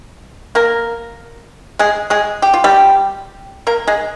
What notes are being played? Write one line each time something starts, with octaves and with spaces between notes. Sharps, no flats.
A#3 A#4
G#3 G#4
G#3 G#4
G4
F4
G3 G4
A#3 A#4
G#3 G#4